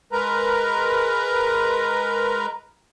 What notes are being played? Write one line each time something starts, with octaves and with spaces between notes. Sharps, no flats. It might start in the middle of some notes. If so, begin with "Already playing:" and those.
G#3 A#4 B4 A#5